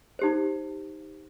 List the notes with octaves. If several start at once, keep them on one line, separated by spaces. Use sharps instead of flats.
D#4 G4 C5